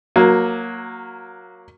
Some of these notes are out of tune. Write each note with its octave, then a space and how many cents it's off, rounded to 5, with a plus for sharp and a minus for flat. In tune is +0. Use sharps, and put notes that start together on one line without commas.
F#3 -15 A#3 +0